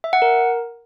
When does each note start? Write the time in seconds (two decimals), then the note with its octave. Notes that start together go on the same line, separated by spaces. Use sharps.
0.04 E5
0.13 F#5
0.22 A#4